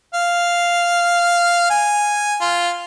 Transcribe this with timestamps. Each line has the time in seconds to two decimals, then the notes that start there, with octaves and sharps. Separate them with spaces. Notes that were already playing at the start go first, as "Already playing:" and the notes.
0.15 F5
1.71 G#5
2.41 F4